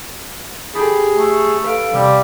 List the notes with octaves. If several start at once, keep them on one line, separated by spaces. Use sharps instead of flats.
G4 G#4 A5 B5
A3
A4 B4 F5 D7
C3 G3